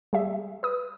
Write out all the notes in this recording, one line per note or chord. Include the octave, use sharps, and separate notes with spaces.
G3 G#4 E5
B4 D#6